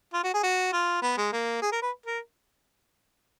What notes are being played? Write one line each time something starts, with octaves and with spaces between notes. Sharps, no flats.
F4
F#4
G#4
F#4
F4
B3
G#3
A#3
G#4
A#4
B4
A#4